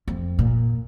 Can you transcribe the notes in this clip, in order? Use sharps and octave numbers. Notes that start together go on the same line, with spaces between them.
F2
A#2